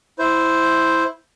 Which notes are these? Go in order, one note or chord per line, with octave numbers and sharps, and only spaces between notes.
E4 C5